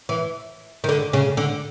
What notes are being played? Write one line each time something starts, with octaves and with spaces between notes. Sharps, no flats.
E3
D#3
D3
C#3
D3